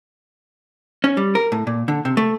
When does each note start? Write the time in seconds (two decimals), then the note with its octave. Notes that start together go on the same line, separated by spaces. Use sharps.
1.04 C#4
1.17 G3
1.35 A#4
1.52 A2
1.67 A#2
1.88 D3
2.05 C3
2.17 A3